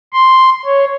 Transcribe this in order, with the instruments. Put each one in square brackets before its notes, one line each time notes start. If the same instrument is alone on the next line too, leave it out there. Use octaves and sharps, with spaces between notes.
[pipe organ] C6
C#5